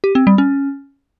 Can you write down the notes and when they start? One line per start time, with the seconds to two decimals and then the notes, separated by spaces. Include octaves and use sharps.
0.04 G4
0.15 C4
0.27 G3
0.38 C#4